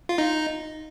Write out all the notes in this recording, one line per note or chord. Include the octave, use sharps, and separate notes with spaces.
F4
D#4